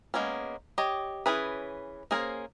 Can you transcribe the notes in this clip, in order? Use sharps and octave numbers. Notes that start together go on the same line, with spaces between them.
G#3 A#3 B3 C#4
G4 C#5 D#5
E3 C#4 G#4 B4
A#3 C#4 G#4 A#4 C5